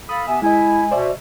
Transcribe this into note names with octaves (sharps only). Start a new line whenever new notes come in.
A4 F5 B5 D#6
C3 B3 E5 G#5
G#3 E4 D#5 G#5
B2 C5 D5 E5